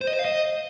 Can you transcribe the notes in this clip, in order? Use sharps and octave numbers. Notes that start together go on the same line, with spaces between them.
C5
D#5
C5
F5
D#5